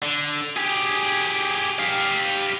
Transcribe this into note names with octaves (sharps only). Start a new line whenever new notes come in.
D3
G4 G#4
G4 F5